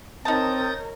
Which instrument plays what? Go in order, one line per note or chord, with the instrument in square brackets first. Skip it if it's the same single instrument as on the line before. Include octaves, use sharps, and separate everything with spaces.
[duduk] C4 [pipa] D#4 A5 [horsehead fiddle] A#4 C#5 [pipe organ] D#6 G6 A6